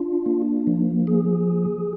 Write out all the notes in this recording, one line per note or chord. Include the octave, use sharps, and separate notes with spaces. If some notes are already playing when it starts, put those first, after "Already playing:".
Already playing: D4 F4
A#3
F3
G#4